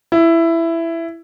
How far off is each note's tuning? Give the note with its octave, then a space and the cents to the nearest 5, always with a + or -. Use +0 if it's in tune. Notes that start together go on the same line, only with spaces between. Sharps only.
E4 +10